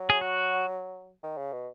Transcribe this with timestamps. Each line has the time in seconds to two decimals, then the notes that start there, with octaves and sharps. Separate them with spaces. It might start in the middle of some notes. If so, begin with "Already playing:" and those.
Already playing: F#3
0.10 G#4
0.21 F#4
1.24 D#3
1.37 C#3
1.53 B2